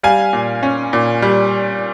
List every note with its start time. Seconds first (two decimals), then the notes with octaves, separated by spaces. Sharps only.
0.03 G3 F5 G#5
0.33 A#2
0.63 C#4
0.93 A#2
1.22 G3